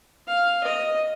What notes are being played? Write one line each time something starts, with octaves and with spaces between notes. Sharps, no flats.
F5
D#5